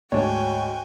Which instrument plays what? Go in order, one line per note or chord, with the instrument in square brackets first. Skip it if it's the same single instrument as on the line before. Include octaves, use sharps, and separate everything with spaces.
[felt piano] D2 G#2 [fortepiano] D4 C#5 [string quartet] F#4 G5 G#5